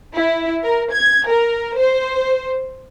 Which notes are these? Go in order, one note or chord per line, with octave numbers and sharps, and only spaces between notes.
E4
A#4
G#6
A#4
C5